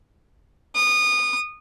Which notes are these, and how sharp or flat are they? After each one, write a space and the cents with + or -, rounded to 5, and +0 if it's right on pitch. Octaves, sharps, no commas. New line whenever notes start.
D#6 -25